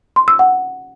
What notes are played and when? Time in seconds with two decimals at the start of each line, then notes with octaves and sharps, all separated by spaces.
0.16 C6
0.28 E6
0.39 F#5